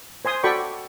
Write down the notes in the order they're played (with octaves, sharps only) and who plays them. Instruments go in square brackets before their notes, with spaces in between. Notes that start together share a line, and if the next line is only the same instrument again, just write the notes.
[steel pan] C5 G#5 C6 D#6
F#4 A4 D5 G5 B5 C#6